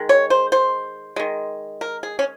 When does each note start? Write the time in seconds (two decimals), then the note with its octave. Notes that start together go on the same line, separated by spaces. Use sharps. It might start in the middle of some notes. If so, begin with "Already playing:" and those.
Already playing: D#3 G#3
0.09 C#5
0.30 C5
0.52 C5
1.16 D#3 G#3
1.81 A#4
2.03 G#4
2.19 C#4